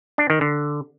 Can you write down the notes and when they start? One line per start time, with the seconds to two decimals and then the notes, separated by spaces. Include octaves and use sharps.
0.18 D4
0.30 D#3
0.41 D3